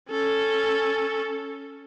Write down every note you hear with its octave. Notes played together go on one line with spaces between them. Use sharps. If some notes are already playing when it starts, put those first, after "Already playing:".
C#4 A4